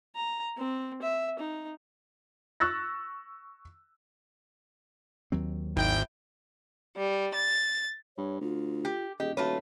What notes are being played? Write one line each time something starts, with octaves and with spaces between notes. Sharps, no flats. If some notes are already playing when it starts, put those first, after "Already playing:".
A#5
C4
E5
D#4
C#6 E6 F#6 A6 A#6
D#2 F#3 C4
G#1 E4 G5
G3
A6
G2 C#5
D2 F4
G4
D#1 G4 G#4 D#5
D#1 A3 F4 F#4 B4 C#5 A5